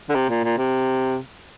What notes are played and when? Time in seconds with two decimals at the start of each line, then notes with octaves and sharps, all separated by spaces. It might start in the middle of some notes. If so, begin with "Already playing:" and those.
0.09 D3
0.15 C3
0.30 A#2
0.44 A#2
0.58 C3